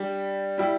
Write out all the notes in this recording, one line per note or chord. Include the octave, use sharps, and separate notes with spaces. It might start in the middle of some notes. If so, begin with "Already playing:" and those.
Already playing: G3 D4 G4
G3 E4 G4